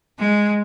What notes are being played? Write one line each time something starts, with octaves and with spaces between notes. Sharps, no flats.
G#3